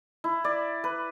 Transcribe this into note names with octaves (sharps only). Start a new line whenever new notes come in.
E4
D5
B4